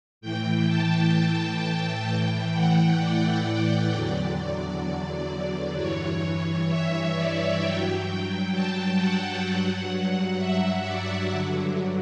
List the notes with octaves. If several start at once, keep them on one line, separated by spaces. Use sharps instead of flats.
A2 E3 G5
A5
A2 E3 G5
F#5
D5
E2 D3 F#3
G2 E3 C#5
E5
D5
G2 F#3 G5
A5
F#5
G2 F#3
E5
D5
G2 D3 F#3